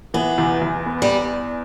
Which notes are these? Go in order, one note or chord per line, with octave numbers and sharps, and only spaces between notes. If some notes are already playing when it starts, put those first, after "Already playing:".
E3 B3
E2
E2
B3
G3